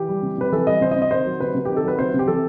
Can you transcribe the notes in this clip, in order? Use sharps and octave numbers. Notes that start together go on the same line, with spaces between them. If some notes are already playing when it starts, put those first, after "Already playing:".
Already playing: E3 G4
G3
C3
C3 B4
E3 A4
G3 D#5
C3 C5
D#5
C3
D#5
D#3 C5
F#3
C3 B4
C3
D#3 G4
A4
F#3 B4
C3 C5
C3
G4
E3 A4